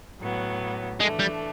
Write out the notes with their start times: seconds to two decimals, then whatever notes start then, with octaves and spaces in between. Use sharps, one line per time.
0.20 A2 F#3 B3
0.99 E3 G#3 A3 D4
1.19 G3